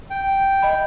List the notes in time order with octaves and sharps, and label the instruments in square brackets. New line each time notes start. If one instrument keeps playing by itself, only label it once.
[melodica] G5
[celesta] D#5 B5